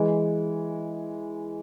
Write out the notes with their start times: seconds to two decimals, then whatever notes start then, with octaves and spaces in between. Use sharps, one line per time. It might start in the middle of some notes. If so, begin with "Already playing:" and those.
Already playing: E3 G#3